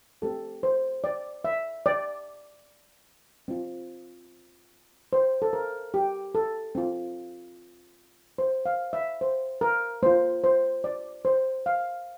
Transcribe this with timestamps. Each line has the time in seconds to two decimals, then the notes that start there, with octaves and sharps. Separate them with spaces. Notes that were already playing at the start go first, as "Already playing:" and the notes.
0.22 A3 C4 G4 A4
0.63 C5
1.04 D5
1.45 E5
1.86 D5
3.48 C4 F4
5.13 C5
5.42 A4
5.53 A#4
5.94 G4
6.35 A4
6.75 C4 F4
8.38 C5
8.66 F5
8.93 E5
9.21 C5
9.61 A#4
10.03 A#3 F4 C5
10.44 C5
10.84 D5
11.25 C5
11.66 F5